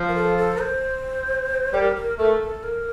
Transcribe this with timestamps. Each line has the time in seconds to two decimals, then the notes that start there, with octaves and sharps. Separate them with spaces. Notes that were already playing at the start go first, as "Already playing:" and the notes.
Already playing: F3
0.08 A#4
0.16 A4
0.38 A4
0.60 C5
1.73 G3 A#4
1.96 A#4
2.18 A3 A#4
2.41 A4
2.63 A#4